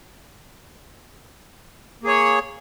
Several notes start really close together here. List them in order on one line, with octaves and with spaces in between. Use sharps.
A#3 G#4 C#5